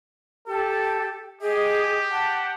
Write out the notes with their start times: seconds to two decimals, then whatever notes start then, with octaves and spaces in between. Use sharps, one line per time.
0.47 G4 A4
1.42 G4 G#4 D#5
2.11 F#5 A5